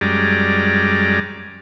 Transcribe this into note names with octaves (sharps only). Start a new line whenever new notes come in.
F#2 G3 G#3 D5 A#5